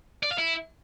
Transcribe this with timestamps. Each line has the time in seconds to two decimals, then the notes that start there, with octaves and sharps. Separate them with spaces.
0.23 D5
0.31 F5
0.38 E4